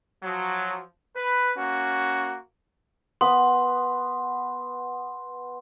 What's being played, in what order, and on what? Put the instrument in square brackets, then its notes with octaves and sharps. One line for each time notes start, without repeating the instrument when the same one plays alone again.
[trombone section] F3 F#3
B4
A#3 C#4 F#4
[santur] B3 [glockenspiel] C6